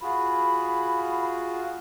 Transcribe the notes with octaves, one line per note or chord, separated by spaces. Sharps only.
F4 F#4 G#4 B5